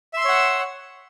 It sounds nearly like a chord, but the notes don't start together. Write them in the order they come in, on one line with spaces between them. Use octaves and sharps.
E5 C6 E6 C#5 F#5